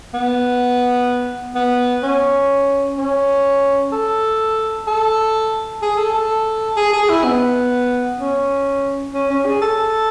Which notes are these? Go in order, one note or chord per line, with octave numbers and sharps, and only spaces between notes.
B3
B3
C#4
C#4
A4
A4
G#4
A4
A4
G#4
G#4
E4
B3
C#4
C#4
C#4
G#4
A4